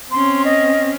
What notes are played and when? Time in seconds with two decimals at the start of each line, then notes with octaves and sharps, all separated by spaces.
0.11 C4 C#4 C6
0.45 D#5